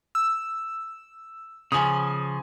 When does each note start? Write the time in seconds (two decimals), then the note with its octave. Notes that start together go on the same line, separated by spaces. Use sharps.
0.15 E6
1.72 C#3 F3 G#5 D#6